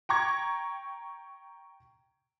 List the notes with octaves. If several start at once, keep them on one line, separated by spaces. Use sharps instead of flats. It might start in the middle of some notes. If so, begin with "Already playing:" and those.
G5 A#5 C#6 G#6